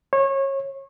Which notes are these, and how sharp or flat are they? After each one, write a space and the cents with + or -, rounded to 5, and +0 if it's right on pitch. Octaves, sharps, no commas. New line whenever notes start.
C#5 -25